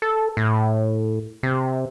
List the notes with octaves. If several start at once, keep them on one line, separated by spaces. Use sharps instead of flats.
A4
A2
C3